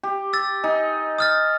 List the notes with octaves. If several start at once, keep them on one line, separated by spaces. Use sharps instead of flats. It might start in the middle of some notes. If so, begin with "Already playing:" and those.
G4
E6 A6
D#4 G#5
D#6 F6 A6